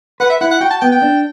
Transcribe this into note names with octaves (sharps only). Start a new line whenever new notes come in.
B4 F#5
E5
E4 F#5
F#5
F#4 G5
A5
B3 G5
G5
D4